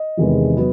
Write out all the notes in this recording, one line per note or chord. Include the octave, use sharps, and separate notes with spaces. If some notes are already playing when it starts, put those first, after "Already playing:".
Already playing: D#5
E2 C3 D#3 G#3 B3
F#3 B3